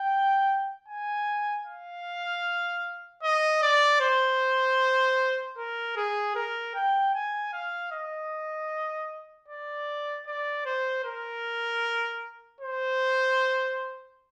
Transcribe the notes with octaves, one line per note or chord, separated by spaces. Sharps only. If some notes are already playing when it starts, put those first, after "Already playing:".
Already playing: G5
G#5
F5
D#5
D5
C5
A#4
G#4
A#4
G5
G#5
F5
D#5
D5
D5
C5
A#4
C5